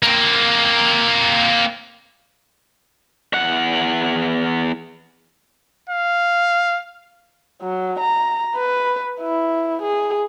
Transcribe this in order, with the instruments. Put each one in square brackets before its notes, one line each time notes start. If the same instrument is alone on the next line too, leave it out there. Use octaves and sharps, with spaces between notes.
[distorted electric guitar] A#3 C4
[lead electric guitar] E2 F#5
[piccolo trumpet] F5
[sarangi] F#3
A#5
B4
E4
G#4